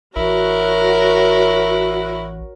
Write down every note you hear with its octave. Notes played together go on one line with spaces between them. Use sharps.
A1 E4 F#4 A#4 C#5